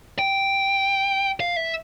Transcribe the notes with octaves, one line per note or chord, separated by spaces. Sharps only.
G5
F5
E5